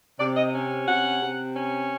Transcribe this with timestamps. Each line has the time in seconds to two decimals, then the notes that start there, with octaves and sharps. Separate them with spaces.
0.20 C3 D5
0.36 D#5
0.54 C#4
0.87 C3 F#5
1.22 C3
1.55 C#4